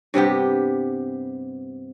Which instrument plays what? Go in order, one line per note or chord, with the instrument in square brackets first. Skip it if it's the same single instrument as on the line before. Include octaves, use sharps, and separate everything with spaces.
[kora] G2 C3 B3 G4